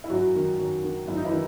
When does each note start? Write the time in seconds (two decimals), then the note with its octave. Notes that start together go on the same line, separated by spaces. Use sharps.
0.04 E4
0.10 F#2 F#3 F#4
0.35 D#3
0.59 F#2
0.83 D#3
1.07 F#2 E4
1.17 D#4
1.25 E3 E4
1.32 D#3